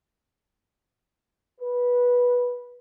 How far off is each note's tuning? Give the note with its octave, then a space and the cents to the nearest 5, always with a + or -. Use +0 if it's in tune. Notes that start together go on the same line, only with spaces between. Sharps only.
B4 -15